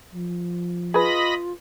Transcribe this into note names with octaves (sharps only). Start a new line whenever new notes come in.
F3
F4 G#4 B4 D#5 B5 A#6